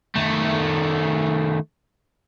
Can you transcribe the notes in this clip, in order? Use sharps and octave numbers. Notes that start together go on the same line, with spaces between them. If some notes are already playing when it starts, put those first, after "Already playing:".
D#3 A3